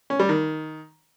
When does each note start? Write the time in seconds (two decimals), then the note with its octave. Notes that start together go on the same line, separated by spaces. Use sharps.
0.10 C#4
0.19 G3
0.29 D#3